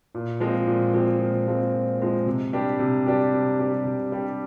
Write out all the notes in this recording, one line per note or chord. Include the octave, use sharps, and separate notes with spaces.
A#2
F3 G#3 C4
A#2
F3 G#3 C4
A#2
F3 G#3 C4
A#2
F3 G#3 C4
C3
G3 D4 G4
C3
G3 D4 G4
C3
G3 D4 G4
C3
G3 D4 G4